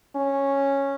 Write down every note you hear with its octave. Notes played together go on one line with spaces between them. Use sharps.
C#4